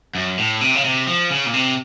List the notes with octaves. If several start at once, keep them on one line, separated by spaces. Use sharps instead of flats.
F#2
A2
C3
C#3
C3
F3
C#3
A#2
C3